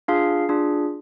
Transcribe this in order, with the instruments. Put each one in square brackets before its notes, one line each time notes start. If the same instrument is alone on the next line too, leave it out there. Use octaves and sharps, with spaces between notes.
[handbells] D4 F4 G#4 F5
D4 F4 G#4